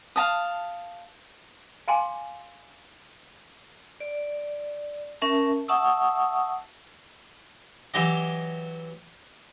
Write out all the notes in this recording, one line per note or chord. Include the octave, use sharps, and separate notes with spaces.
F5 A5 D#6
F5 G5 G#5 A#5 C6 D6
D5
C#4 A#4 E5 A5
E5 F#5 A5 C#6 D#6 E6
E3 F#3 G4 D#5